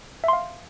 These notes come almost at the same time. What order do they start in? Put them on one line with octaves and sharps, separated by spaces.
E5 C6 F5